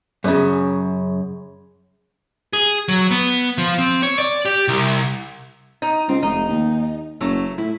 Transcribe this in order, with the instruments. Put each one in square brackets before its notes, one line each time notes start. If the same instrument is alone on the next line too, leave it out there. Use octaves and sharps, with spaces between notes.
[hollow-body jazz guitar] F#2 C#3
[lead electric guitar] G#4
F#3
B3
F3
C4
C#5
D5
G4
C2
[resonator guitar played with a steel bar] D#4
[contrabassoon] C#2 [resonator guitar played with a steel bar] C4
[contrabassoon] F1 [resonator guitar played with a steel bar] D#4
[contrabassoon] D#2
[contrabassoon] F#1 [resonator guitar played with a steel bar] F#3 A3
[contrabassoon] A2 [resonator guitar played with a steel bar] E4